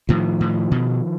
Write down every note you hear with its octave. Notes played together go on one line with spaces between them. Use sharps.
A2 D#3 F3
A2
B2